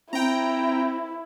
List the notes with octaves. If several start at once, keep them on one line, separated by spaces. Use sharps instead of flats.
C4 E4 G5 A#5